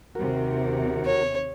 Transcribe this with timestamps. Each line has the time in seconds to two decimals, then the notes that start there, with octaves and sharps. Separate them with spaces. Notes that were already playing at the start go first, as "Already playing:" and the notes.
0.15 D#2 C3 F#4 A#4
1.05 C#5